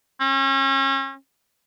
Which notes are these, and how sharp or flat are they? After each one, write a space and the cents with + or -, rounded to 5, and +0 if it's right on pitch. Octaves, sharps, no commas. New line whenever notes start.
C#4 -35